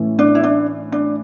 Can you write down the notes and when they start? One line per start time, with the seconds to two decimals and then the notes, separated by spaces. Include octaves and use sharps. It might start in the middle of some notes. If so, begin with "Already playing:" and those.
Already playing: A2 E3 A3 C#4 E4
0.19 D4
0.35 E4
0.43 D4
0.92 D4